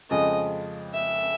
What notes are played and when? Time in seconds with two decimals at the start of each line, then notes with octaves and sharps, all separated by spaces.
0.10 F2 C#3 F3 G#3 D#5
0.93 E5